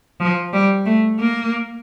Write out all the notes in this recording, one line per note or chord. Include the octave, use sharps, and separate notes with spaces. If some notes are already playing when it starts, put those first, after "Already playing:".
F3
G3
A3
A#3